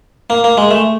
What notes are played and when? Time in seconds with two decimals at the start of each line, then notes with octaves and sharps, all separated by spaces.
0.30 A#3
0.44 A#3
0.57 G#3
0.71 A3